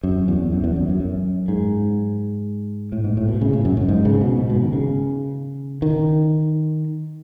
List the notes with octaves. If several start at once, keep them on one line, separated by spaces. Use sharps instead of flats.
F#2
E2
F#2
E2
F#2
F#2
F#2
G#2
A2
G#2
A2
B2
C#3
A2
F#2
F#2
G#2
C#3
B2
G#2
B2
D#3
C#3
D#3